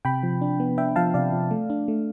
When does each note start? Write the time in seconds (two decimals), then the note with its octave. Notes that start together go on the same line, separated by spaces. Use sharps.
0.05 C3 G5 B5
0.23 F3
0.42 D4
0.60 B3
0.78 D4 E5 G5
0.96 F3 F5 A5
1.14 C3 D5 F5
1.32 F3
1.51 A3
1.70 D4
1.88 A3